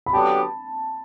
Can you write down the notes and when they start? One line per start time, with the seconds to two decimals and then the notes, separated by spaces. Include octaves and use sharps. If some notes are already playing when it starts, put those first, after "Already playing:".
0.06 B5
0.13 D3 F#3 B3 D4 G4 A5